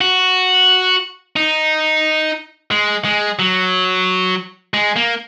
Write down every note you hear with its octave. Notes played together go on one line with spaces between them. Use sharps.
F#4
D#4
G#3
G#3
F#3
G#3
A#3